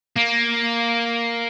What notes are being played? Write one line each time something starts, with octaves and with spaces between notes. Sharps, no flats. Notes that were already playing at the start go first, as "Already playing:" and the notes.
A#3